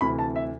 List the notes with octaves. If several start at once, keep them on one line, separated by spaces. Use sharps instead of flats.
D2 C3 E3 B5
A5
E5